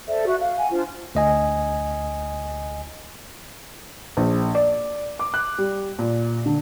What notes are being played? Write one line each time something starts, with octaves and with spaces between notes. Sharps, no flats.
A4 C5 D5 E5
F#4 E5
F5
F#5 G#5
D4 F4 C5
D2 D#5 G#5
A#1
D5
D6
F#6
G3
A#2
D3